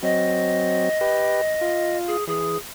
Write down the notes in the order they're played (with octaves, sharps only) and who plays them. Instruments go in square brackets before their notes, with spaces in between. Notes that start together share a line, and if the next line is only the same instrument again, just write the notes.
[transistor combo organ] F#3 C4 [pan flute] D#5
[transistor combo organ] G4 B4
F4
[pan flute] G#4
[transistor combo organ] E3 [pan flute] G#4